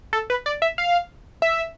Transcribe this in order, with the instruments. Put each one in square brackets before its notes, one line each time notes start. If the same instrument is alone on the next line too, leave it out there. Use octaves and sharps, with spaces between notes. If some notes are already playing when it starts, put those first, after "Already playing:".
[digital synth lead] A4
B4
D5
E5
F5
E5